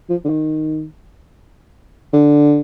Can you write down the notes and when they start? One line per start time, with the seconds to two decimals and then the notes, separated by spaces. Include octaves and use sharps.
0.10 F3
0.24 D3
0.29 D#3
2.13 D3